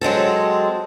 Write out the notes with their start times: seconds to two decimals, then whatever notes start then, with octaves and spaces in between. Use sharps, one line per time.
0.01 F#3 G#3 C4 A4